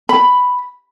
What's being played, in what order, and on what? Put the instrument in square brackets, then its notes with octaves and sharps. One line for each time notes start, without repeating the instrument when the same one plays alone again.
[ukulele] B5